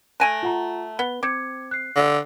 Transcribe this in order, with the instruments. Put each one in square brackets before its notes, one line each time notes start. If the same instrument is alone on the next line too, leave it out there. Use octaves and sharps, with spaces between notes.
[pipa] A3 G#5 A5 [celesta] F#6 A#6 D7
[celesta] F4 F#5 A#5
[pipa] B3 [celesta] G7
[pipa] C4 [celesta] D6 G#6 C#7
[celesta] F#6 C7
[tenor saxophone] D3